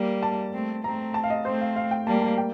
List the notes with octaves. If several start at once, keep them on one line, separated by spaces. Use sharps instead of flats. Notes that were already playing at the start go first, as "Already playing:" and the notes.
Already playing: G3 A#3
A5
A3 C4
A3 C4 A#5
A5
F5
D#5
A3 C4 C5
F5
F5
G5
G3 A#3 A5
A5
G5